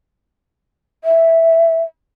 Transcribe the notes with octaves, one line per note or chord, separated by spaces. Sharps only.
E5